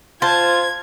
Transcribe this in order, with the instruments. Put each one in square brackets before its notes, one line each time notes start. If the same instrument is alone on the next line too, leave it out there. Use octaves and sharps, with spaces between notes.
[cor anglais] F4 [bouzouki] C5 [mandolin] A5 [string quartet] G#6